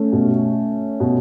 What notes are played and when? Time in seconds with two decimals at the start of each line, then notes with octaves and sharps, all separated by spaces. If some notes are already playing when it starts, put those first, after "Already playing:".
Already playing: A3 C#4
0.12 B2
1.00 B2